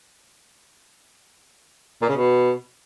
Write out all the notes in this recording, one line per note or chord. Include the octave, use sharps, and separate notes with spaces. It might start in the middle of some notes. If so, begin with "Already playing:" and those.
A#2
C#3
B2